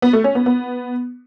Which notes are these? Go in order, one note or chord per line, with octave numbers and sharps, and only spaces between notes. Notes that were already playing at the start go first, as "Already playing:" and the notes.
B3
A3
C#4
B3
B3